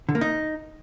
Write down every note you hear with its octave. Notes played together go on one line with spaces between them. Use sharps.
D3
A#3
D#4